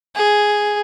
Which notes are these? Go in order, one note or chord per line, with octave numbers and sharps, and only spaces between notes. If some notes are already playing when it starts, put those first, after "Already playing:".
G#4